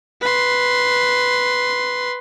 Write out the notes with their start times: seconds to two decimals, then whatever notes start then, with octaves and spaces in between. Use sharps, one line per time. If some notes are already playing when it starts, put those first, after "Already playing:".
0.22 B4 C6